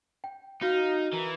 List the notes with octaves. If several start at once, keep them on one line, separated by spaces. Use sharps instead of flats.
G5
D#4 F#4 F5
E3 A#4